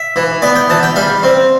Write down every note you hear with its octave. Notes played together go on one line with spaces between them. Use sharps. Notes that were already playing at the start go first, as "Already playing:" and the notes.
Already playing: E5
E3
B3 D5
G5
E3 A5
G5
G3 F5
C4